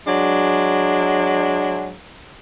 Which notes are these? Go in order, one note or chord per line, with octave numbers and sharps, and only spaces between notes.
F#3 G#3 D4